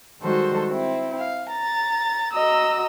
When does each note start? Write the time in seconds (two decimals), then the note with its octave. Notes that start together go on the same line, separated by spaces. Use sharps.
0.21 D#3 G3 G#3 F#4 A4 C5
0.70 C4 E4
1.17 F5
1.50 A#5 A6
2.32 F#4 D#5 A#5 E6